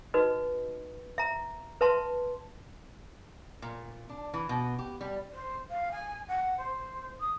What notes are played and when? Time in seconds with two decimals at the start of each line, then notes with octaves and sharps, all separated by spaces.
0.14 D#4 F#4 B4 D#5
1.18 E5 A#5
1.81 B4 E5 A5 C6
3.62 A#2
4.09 D4
4.34 E3
4.49 B2
4.79 G4
5.01 G3
5.32 C5
5.70 F5
5.91 G#5
6.28 F#5
6.57 C5
7.20 D#6